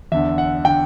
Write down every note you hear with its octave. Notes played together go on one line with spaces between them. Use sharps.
E2 D3 E5
F#5
D3 G5